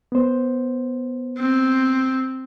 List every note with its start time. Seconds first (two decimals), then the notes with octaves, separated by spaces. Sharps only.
0.12 B3 C5
1.38 C4